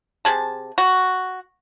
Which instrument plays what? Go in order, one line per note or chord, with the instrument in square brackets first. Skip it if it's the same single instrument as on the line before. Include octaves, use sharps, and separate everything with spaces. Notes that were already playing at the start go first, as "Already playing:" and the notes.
[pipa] C3 G#4 A5
F#4